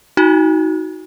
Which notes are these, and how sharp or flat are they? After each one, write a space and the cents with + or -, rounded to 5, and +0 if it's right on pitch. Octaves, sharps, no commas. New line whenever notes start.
D#4 +25 F#4 +0